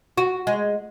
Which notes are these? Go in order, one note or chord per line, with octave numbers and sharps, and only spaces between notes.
F#4
G#3